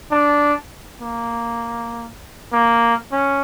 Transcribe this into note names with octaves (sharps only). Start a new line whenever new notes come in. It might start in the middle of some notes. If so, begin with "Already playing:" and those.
D4
A#3
A#3
C#4